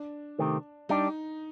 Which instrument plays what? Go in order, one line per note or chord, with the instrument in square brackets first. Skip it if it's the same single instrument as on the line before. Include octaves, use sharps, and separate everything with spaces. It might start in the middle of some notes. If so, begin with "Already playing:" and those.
Already playing: [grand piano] D4
[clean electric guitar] C3 D#3 A3 C4 G4
[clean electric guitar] G3 D4 G4 [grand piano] D#4